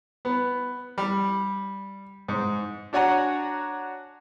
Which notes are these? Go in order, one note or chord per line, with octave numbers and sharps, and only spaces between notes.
B3
G3
G#2
D4 F#4 C#5 F#5 G#5 A#5